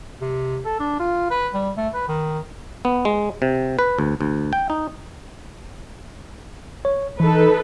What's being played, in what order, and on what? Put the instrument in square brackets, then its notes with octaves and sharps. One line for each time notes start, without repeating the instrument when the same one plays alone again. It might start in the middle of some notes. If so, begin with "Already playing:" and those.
[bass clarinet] C3
A4
D4
F4
B4
G3
A3
B4
D#3
[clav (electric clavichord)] B3
G#3
C3
B4
D2
D2
G5
D#4
[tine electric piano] C#5
[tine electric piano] E3 [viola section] D#4 A4 B4